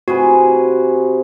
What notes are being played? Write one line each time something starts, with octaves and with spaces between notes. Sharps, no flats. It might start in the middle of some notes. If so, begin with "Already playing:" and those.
C3 F#4 G#4 B4